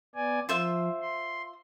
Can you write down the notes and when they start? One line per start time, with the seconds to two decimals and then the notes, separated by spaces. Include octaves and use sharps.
0.15 B3 D5 G#5
0.49 F3 F4 C5 E5
1.01 C6